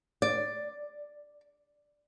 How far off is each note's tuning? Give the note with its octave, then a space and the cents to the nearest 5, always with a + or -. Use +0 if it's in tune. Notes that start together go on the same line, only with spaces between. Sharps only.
D5 +5